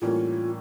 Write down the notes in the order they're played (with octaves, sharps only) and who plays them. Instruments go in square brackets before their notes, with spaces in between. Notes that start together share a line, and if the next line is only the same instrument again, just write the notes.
[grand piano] A2 E3 G3 A#3 C#4 [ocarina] F4